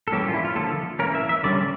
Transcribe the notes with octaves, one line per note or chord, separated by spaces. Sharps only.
A4
E3 G3 A#3 C#4 G4
G4
F4
E4
F4
D3 F3 A#3 A4
E3 A#3 C#4 A#4
E5
E5
D3 G3 C#4 D5